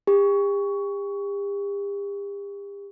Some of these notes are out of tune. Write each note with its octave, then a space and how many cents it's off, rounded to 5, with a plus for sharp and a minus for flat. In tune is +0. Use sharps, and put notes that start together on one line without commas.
G4 +40